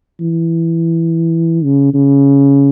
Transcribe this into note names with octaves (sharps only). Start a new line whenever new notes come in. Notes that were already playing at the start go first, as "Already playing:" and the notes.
E3
C#3
C#3